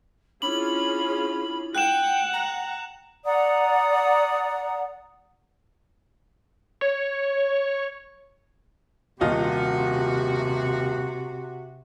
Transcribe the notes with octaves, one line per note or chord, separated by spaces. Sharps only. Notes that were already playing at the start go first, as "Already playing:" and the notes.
C#4 D4 E4 F4 G#4 B5 F#7
F#5 G5 F#6 E7
G5 A#5
D5 F#5 A#5 D#6
C#5
D#1 C3 F4 F#4 D#5